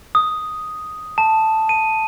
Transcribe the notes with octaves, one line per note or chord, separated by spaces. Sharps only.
D#6
A5
D#7